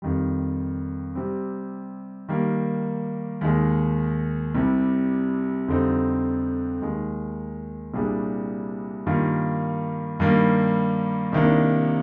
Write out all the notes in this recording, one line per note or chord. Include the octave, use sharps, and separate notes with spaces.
F2 D#3 G3
C3 G3 C4
D#3 G3 A#3
D#2 D#3 G#3
C2 C3 G3
F2 D3 G3 C4 D#4
D#2 D#3 G#3
C2 A#2 G3 D4 G#4
G2 D#3 A#3 F4
G2 D#3 G3 A#3
C2 C3 D#3 A#3 D4